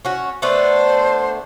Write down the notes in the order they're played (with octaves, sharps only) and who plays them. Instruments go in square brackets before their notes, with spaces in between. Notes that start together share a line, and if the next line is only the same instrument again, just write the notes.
[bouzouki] C#4 F#4
[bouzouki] A3 B3 D4 [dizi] C5